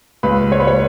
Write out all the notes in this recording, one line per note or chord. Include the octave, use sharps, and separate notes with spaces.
C#2 B4
C#2 C#5
B4
C#5